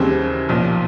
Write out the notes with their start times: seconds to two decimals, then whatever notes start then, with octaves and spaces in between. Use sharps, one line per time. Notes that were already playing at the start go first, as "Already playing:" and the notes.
Already playing: D#2 C#3 E3 G3 C4
0.49 B1 A#2 F3